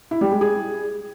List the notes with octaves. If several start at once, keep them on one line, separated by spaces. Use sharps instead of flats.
E4
G3
G#3
G#4